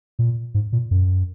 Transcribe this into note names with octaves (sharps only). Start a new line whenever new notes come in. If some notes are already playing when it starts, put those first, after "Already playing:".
A#2
G#2
A#2
F#2